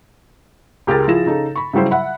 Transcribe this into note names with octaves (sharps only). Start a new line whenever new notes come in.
C#2 G4 G#4 A#4 A6
F3 E4 G#4 A#6 E7
C#3 D#4 A4
B5 C#6
C#3 F#3 G3 E4 C5
E5 F#5 B5